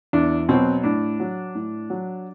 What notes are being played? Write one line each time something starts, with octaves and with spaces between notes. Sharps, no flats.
E2 D4
B2 F#3 C4
A2 D4
F#3
A2
F#3